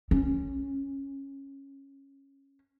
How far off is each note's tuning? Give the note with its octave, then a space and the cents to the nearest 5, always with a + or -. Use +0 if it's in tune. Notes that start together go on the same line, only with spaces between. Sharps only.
C#4 -10